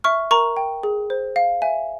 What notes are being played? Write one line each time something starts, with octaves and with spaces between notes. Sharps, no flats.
E5 C#6 F6
A#4 A#5 C#6
G5
G#4
C5
F5
E5 G#5